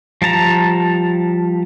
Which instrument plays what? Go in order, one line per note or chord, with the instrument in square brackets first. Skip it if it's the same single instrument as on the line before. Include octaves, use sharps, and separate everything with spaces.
[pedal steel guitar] F3 G3 A5 A#5